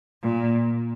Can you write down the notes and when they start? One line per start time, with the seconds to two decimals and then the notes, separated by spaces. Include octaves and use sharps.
0.23 A#2